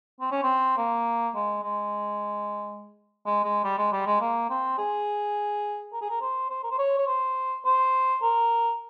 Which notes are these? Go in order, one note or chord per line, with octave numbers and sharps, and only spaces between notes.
C4
C#4
C4
A#3
G#3
G#3
G#3
G#3
G3
G#3
G3
G#3
A#3
C4
G#4
A#4
G#4
A#4
C5
C5
A#4
C5
C#5
C#5
C5
C5
A#4